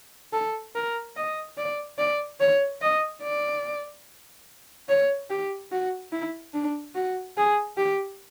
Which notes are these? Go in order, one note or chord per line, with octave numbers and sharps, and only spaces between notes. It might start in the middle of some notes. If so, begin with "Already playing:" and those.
A4
A#4
D#5
D5
D5
C#5
D#5
D5
C#5
G4
F#4
E4
D4
F#4
G#4
G4